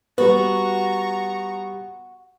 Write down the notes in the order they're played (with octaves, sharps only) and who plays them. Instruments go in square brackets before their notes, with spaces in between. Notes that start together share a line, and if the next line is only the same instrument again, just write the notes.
[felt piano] G3 B3 [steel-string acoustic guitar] F#4 [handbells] B4 [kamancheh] A#5 C#6